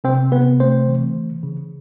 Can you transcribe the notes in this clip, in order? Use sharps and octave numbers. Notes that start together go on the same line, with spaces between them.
C3 C4 C5
C3 B3 B4
A3 C4 C5
E3
C#3
C#3